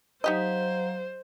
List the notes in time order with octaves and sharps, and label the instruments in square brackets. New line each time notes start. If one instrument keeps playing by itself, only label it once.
[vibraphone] F#3 F5 A#5 [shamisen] D#4 G4 D#5 [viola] C5